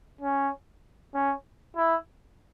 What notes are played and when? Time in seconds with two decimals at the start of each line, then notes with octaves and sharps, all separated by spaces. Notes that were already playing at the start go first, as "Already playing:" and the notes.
0.21 C#4
1.15 C#4
1.77 E4